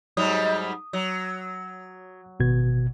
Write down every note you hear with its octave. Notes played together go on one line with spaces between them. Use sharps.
G#2 F#3 G3 D#6
F#3
G#1 B2 G#6